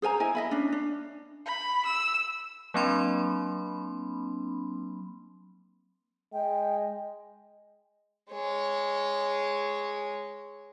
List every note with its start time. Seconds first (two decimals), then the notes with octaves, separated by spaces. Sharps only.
0.02 G#4 C5 G#5 A#5
0.20 E4 D#5 G#5
0.35 D#5 E5 B5
0.51 C#4 D4
0.72 D4
1.46 B5
1.86 E6
2.74 F#3 A#3 C4 D4 B5 C6
6.33 G#3 G5
8.31 G#3 C#5